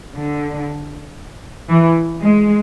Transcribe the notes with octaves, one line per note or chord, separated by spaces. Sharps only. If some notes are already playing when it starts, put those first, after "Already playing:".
D3
E3
G#3